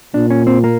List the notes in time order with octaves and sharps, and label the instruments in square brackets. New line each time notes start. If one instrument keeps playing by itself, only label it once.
[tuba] A#2 [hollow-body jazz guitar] D4
[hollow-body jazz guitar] C#4
C4
A#3